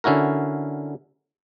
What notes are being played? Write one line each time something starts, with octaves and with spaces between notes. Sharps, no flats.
D3 C#4 E4 F#4 A#4